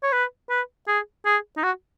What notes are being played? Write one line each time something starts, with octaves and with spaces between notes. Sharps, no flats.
C#5
B4
B4
G#4
G#4
D#4
F#4